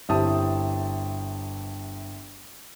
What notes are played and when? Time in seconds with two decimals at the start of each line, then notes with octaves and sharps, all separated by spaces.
0.09 G1 C4 E4 G4 A5 D#6